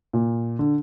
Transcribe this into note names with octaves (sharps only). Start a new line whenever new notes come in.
A#2
D3